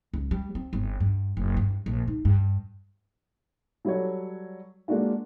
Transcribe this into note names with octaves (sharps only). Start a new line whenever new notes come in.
C#2
G3
C4
G1
G2
F#1
G2
A#1
D#4
G2
F#3 G3 F#4 A4 C#5
G#3 A#3 D4 F4 F#4